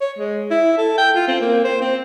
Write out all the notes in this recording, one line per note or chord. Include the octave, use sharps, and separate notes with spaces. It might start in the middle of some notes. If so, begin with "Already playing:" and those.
C#5
G#3
E4
A4
G5
F4
C4
A#3
C5
C4